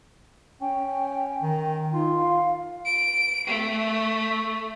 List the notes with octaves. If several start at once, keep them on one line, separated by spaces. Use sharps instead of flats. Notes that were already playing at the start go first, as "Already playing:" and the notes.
C#4 G5
D#3
D#4 F4
F5
D7
A3